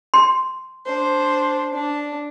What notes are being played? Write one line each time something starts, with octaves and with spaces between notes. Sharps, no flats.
C6
D4 C5
D4